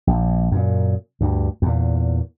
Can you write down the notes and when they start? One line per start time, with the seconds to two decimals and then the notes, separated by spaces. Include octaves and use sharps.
0.07 A#1
0.52 F#2 A#2
1.21 D2 G2
1.62 E2 A#2